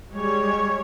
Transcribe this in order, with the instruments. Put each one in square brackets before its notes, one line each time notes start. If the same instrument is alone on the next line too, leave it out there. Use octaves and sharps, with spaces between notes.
[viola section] G3 G#3 C#5